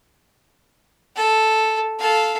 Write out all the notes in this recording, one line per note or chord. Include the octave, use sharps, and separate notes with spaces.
A4
A4 F5